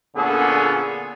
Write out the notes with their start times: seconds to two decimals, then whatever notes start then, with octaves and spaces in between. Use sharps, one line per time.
0.15 A#2 D3 B3 C#4 G#4 A4